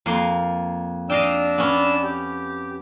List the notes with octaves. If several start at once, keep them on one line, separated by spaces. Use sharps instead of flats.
F2 A#3 C6
D4 D#5 F5 G5 E6
B3 C#4
G4